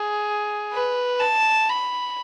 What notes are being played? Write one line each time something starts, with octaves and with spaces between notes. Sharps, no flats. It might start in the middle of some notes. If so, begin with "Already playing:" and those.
Already playing: G#4
B4
A5
B5